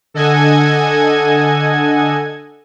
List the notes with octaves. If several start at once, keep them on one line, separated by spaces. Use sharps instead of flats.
D3 A4 D#5 F#5 G#5 G#6